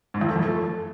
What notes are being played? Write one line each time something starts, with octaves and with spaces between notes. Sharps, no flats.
G#2
E2
A3
F2
A3